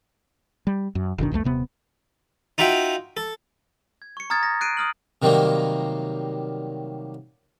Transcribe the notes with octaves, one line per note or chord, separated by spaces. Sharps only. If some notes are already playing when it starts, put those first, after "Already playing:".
G3
F#2
F#1 B2 D#3 D4
B1 E2 D#3 A3
D#1 C3 B3
D#4 F4 F#4 E5 G5
A4
G#6
C#6 C#7
A#5 D#6 F6 G#6 A6
A#6
F#6 C7 D7 D#7
D#6 F6 F#7
C3 D#3 F#3 G3 A#3